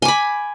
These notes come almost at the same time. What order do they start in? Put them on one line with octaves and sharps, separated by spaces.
G#5 D6 B5